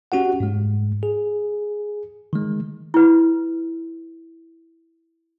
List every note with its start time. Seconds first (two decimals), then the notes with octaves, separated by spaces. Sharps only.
0.12 C#4 F#4 G4 F#5
0.40 G#2 G#3
1.03 G#4
2.33 D#3 G#3
2.94 E4 B4